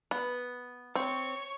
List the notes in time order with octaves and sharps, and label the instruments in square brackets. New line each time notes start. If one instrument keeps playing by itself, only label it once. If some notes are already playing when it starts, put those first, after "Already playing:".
[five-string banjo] B3
[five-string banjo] C4 [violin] C#5 C#6